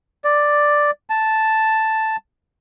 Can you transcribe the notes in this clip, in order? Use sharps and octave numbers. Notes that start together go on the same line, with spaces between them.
D5
A5